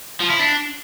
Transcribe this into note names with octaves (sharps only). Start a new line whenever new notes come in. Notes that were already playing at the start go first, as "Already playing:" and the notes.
F3
E4
D4